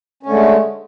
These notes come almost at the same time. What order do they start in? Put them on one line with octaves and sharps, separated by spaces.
C#4 D3 A3 G#3